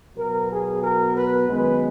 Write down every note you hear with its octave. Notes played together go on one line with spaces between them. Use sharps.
B2 F#3 B3 A#4
G#4
A#4
B4
F#2 D#3 G#3 B3 B4